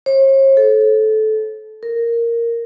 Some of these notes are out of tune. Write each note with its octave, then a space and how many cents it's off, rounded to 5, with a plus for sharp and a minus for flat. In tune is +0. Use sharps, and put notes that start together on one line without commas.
C#5 -45
A4 -20
A#4 -5